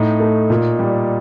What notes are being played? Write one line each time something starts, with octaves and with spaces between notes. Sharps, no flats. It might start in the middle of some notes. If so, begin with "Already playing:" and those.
Already playing: A2 D#4
A3
A#2
G3